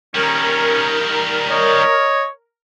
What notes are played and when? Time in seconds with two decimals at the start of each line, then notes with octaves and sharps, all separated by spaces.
0.15 D#3 G3 C#4 A#4
1.51 C#5 D#5